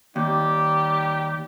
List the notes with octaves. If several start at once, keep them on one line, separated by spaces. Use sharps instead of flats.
D#2 G3 D#4 G4